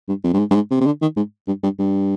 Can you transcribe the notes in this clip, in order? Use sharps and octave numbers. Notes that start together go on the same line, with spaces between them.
G2
F2
G2
G#2
G2
G#2
C3
C3
D3
D#3
G#2
G2
G2
G2